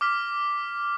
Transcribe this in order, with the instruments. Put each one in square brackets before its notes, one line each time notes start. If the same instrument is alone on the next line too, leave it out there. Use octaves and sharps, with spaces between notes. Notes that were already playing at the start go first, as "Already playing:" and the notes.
[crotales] D6 F6 B6